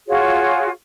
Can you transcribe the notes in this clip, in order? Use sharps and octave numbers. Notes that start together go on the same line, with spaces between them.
F4 F#4 G#4 C#5